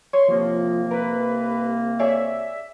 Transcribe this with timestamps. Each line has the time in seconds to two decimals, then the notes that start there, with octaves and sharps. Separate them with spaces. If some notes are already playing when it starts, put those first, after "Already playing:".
0.13 C#5 C6
0.28 C2 C3 F3 A#3
0.91 A#4 B4
1.99 G#4 C#5 D5 E5